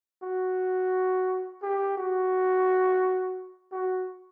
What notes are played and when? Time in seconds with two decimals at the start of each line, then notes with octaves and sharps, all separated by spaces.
0.22 F#4
1.62 G4
1.97 F#4
3.72 F#4